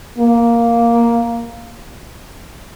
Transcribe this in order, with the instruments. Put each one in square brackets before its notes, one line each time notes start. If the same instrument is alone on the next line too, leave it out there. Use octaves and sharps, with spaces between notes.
[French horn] A#3